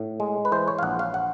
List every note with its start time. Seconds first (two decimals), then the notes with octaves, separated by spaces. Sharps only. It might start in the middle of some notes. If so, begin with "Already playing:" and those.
Already playing: A2
0.20 G#3
0.45 B4
0.52 E3 C5
0.68 C#5
0.79 F5
0.83 A#1 F#5
0.99 F5
1.14 F#5